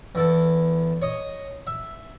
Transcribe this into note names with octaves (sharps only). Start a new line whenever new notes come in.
E2 E4 A4
C#5 D#5
E5